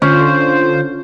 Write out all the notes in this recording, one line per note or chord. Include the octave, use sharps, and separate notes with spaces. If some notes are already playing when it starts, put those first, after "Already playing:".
D3 C#4 F4 C5